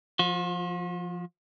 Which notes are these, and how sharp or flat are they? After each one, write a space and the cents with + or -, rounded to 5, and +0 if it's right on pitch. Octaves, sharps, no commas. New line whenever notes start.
F3 +0 F4 +45